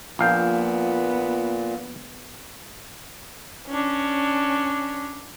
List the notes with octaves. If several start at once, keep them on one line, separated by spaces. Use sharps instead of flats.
A#1 A#2 B3 F5 G5
C#4 D4